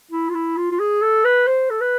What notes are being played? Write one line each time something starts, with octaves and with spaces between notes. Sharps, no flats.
E4
F4
E4
F4
F4
G#4
A4
B4
C5
A4
B4